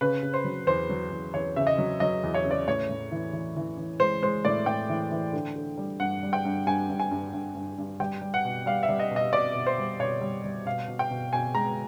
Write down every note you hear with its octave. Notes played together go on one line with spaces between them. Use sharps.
C#3 B4
C#3
C5
F#3
E2 C5
F#3
E2
E2 C#5
C#3 E5
D#5
F#3
F#3 D#5
E2
C#5
C#3
D5
A2 C#5
A2
E3
E3
E3
E3
G#3 C5
G#3 C5
A2 D5
A2 G5
E3
E3
D3
D3
G3
G2 F#5
G3
G5
G2
G2 G#5
G2
G#5
G2
G2
G2
G2
G3 G5
G3
F#5
B2
G3 F5
E5
G3
D#5
B2
D#5
B2 D5
B2
C5
G3
B2 C#5
G3
G3
B2 F5
B2
G5
B2
B2 G#5
G#3 A#5